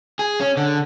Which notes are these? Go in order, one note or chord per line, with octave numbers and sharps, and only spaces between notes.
G#4
C#4
D3